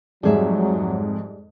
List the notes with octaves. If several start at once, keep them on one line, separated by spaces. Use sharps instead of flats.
F2 G#2 F#3 G3 G#4 E5